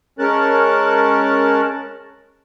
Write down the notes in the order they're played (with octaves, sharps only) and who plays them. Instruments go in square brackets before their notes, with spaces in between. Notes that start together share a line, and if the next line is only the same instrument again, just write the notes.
[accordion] G#3 C#4 A#4 A5 F#6